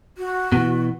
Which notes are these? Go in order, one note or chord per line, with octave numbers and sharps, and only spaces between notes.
F#4
B2 E3